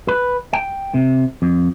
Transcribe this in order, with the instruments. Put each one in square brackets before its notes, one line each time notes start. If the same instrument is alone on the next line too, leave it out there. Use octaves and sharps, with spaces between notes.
[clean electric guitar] B4
G5
C3
F2